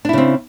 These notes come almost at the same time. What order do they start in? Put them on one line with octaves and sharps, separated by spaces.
D4 E4 C#3 C4